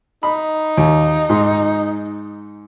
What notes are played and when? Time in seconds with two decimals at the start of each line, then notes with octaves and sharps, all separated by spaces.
0.23 D#4 B5
0.77 D#2
1.29 G#2